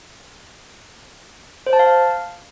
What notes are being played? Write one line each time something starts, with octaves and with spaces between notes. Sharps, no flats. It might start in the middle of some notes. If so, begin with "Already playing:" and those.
C5
A5
F5